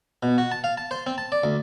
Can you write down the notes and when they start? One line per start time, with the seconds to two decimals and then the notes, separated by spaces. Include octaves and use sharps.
0.23 B2
0.38 F#4
0.52 A5
0.64 F5
0.78 A5
0.91 C5
1.06 C4
1.18 A5
1.32 D5
1.43 D2